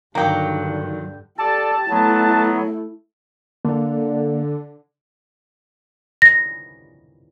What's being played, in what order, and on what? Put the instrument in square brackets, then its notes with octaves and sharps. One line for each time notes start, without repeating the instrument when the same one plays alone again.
[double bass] G2 D3 [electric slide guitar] D#3 F#3 [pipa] A#3 G4
[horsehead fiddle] G4 [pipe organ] A4 D5 [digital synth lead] A5
[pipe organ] F#3 B3 [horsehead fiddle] A3 E4
[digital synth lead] D3 [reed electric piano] A#3
[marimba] A#6